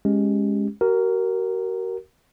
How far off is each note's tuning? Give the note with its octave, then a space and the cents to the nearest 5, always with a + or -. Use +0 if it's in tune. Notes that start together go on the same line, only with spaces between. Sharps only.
G#3 +0 C#4 +0 G4 +0
F#4 +40 A#4 -5